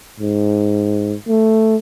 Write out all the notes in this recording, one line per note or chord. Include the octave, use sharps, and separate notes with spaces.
G#2
A3